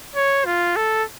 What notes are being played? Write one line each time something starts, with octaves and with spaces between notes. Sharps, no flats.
C#5
F4
A4